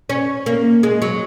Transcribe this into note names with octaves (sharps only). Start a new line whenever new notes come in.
C#4
A#3
G#3
F#3